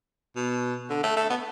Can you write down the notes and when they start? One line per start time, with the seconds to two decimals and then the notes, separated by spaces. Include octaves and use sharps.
0.36 B2
0.90 D3
1.03 A3
1.16 A3
1.30 B3